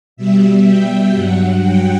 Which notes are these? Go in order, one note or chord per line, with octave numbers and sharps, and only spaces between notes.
B2 G3 E5
G5
G2 F#3 F#5
G5